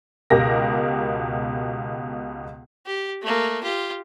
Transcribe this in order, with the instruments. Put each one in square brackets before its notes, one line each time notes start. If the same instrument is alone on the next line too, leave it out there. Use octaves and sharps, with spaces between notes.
[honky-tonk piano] C#2 B2 G4 A#4 A#6
[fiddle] G4
A3 A#3
F4 G4